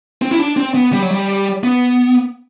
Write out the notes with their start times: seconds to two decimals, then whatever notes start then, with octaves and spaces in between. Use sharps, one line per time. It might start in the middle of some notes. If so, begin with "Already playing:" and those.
0.22 C4
0.31 E4
0.39 D4
0.57 C4
0.74 B3
0.93 G3
1.02 F#3
1.11 G3
1.64 B3